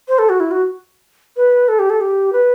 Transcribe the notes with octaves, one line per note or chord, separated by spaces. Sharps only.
C5
A4
F#4
E4
F#4
B4
A4
G4
A4
G4
B4